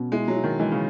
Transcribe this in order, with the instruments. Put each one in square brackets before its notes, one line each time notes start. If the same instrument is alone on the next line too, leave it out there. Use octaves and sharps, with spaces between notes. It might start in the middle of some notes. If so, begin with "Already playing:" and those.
Already playing: [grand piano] B2 C#4
[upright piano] G#3 [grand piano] E4
[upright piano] F#3
[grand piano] E4
[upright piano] D#3
[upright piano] E3 [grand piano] G#3
[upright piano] C#3